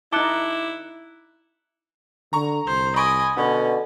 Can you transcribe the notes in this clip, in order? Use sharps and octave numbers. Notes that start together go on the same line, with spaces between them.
D#4 E4 A5 D6 F#6 C#7 G7
D3 A#5 C#6
C2 C5
D#5 G#5 B5 C#6 D7
B2 D3 C#4